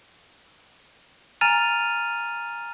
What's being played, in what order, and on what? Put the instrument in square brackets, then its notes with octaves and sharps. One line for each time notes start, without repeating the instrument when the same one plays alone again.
[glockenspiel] G#5 A#5 F6 A6 D#7 F7